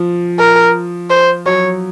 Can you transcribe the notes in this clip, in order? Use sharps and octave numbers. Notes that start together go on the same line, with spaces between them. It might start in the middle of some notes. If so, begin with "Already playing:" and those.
Already playing: F3
A#4
C5
F#3 C#5